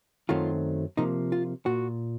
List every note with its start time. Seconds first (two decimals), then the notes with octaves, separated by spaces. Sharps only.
0.29 F#2 D#3 F#3 A3 C4 F4
0.97 C3 F3 A#3 D#4
1.32 F4
1.66 A#2 F#4